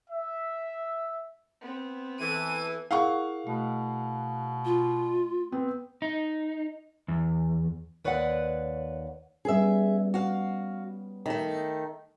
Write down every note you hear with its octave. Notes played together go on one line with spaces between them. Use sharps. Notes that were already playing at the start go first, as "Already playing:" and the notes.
E5
B3 C4
E3 A4 D#7
E4 G#4 A#4 F5 F#5 C#6
B2 A3
F4
B3 C4
D#4
E2
D#2 B4 C#5 D5 F5 F#5
G3 B3 C#4 G#4 E5
F#4 F5
D#3 A3